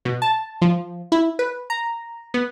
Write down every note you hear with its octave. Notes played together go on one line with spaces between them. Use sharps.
B2
A5
F3
E4
B4
A#5
B3